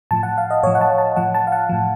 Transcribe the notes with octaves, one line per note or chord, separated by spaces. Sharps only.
A2 F3 A5
F#5
F5
D#5
A2 F3 C#5
F#5
A5
A5
A2 F3 F#5
A5
F5
F#5
A2 F3